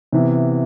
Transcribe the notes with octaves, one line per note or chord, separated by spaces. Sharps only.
C3 E3 B3